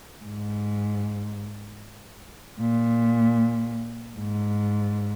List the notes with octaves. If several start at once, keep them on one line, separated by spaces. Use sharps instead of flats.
G#2
A#2
G#2